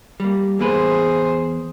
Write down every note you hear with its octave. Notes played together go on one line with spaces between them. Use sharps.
G3 A#3
E2 A#3 G#4 B4 C5